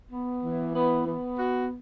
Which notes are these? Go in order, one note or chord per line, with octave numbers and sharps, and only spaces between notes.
B3
E3
B3
B3
F#4